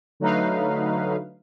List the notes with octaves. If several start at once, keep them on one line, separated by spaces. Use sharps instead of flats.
D3 F#3 A3 D#4 B4 F5